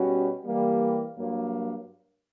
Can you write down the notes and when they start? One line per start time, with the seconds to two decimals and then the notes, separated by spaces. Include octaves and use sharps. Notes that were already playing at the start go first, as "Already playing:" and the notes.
Already playing: B2 G3 C#4 F#4
0.44 E3 G3 A#3
1.17 G2 F#3 A#3